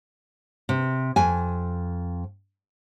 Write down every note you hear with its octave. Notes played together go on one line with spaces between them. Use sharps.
C3
F2 G#5